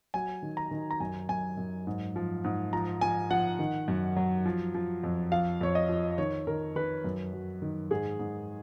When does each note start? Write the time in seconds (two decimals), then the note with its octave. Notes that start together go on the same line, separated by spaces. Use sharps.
0.14 F#3 G#5
0.42 D#3
0.57 A#5
0.71 D#3
0.91 A#5
1.00 F#2 G#5
1.29 F#2 G#5
1.57 F#2
1.87 G#2
2.16 F3
2.44 G#2
2.73 F3 A#5
3.01 F3 G#5
3.31 F3 F#5
3.59 D#3
3.88 F#2
4.16 F#3
4.46 F3
4.74 F3
5.03 F2
5.32 F3 F5
5.61 F2 C#5
5.75 D#5
5.89 F3
6.18 D#3 C#5
6.47 D#3 A#4
6.76 D#3 B4
7.04 F#2
7.33 F#3
7.62 D#3
7.91 G#2 G#4
8.19 G#2